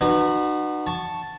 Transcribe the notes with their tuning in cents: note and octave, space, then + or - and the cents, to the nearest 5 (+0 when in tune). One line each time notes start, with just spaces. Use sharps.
D#4 -40 F#4 +0 B4 -5
A5 +0 C#6 +0